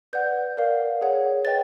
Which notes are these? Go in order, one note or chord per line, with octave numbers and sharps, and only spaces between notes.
B4 D5 F#5 G6
A#4 D5 F5
G#4 C#5 F#5
B4 D#5 G5 A6